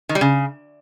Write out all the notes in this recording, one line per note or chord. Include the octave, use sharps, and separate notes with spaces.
D#3
G3
C#3